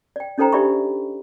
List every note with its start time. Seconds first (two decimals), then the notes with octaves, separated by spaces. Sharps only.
0.16 D5 G5
0.38 C#4 D#4 A4 C5 G5 A#5
0.53 D4 G4 D5 E5 B5 C#6